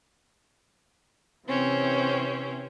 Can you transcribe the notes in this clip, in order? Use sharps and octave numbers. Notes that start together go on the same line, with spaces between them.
C3 E3 C4 C#4